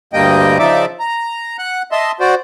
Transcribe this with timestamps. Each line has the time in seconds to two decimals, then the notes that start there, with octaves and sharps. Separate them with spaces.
0.13 D2 G2 G3 A#3 D#5 G5
0.59 C#3 F3 D#4 D5 E5 D6
1.00 A#5
1.59 F#5 F#6
1.92 D#5 E5 A5 C6
2.20 F#4 C5 D5